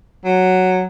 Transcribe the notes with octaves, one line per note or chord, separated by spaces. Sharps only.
F#3